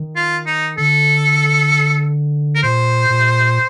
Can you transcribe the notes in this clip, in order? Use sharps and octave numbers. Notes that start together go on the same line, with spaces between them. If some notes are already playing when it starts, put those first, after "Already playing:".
Already playing: D#3
F4
D#4
D3 A4
A#4
A#2 C5
A#2